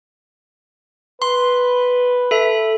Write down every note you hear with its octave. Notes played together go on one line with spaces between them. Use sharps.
B4 C6
A4 E5